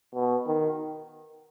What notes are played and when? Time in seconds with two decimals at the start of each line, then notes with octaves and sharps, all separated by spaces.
0.15 B2
0.47 D#3